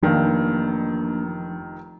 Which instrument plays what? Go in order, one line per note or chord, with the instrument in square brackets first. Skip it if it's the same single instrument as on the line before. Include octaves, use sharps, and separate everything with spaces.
[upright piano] F1 D#3 [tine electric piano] F3 [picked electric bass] A#3 D4